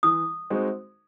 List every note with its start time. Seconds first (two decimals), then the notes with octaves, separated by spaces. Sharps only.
0.03 E3 D#6
0.50 G#3 C4 D#4 F#4